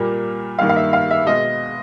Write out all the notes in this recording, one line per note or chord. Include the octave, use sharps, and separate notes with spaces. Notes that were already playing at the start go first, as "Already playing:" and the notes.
Already playing: A#2 G3 A#3
G2 D#3 G3 A#3 F5
F5
E5
F5
E5
B2 G#3 D#5